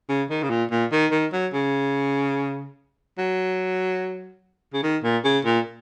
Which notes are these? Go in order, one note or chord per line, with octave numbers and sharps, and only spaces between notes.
C#3
D#3
C#3
A#2
A#2
D#3
D#3
F#3
C#3
F#3
C#3
D#3
A#2
C#3
A#2